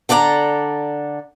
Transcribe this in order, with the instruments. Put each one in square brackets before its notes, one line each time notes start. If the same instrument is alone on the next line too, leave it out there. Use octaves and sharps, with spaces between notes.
[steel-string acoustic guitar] D3 A4 D5 F#5 A#5